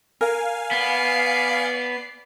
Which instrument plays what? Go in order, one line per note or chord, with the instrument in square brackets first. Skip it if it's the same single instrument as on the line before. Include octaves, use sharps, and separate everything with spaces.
[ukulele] A#4 [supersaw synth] F5 G#5
[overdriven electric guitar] B3 [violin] D5 C7